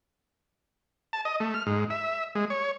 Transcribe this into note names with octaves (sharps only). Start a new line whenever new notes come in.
A5
D#5
A3
F6
G#2
E5
G#3
C#5